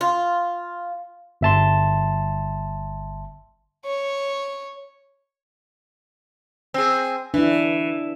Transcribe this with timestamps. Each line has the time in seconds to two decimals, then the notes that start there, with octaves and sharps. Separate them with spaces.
0.01 F4
1.41 G1 E5 A5 C6
3.85 C#5
6.74 C4 G#4
7.34 E3 D4 E4